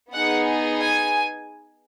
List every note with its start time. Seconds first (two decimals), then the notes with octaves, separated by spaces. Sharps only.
0.13 B3 D#4 G#4 F#5
0.79 G#5